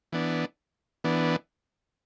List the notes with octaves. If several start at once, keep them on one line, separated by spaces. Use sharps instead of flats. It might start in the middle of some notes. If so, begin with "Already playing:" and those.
E3 B3 D4
E3 B3 D4